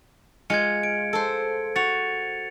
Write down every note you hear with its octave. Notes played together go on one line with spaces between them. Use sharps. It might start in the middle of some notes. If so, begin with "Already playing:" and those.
G#3 F4 G#6 C#7
D7
A4 C5
F#4 A6 C#7 F7